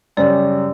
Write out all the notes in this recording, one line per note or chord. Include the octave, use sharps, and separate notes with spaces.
F#2 C#3 G3 C#4 G4 D5